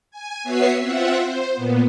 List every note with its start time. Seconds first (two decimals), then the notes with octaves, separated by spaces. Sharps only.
0.11 G#5
0.44 B3 F#4 B4 C#5 E5 C7
0.80 C4 F4 E5 F#5
1.17 C5
1.53 A#2 B3